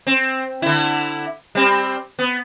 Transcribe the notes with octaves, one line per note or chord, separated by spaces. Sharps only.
C4
D3 E4
G3 C4
B3